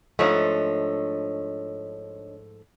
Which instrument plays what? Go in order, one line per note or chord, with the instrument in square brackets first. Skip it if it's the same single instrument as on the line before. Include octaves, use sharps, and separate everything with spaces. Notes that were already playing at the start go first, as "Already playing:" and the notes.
[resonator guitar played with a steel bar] G#2 F3 A3 [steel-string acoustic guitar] D4 C#5 D#5